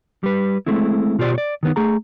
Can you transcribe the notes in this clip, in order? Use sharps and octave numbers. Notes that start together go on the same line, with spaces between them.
G3 B4
G#3 A3 C4 E4
B2 F4 G4 C5 D5
C#5 D5
D#3 B3 D#4
A3 G#4 A#5